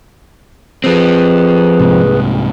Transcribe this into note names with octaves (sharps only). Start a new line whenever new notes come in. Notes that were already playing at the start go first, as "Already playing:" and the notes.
F3 C4 G#4 B4
C2 G#2 C3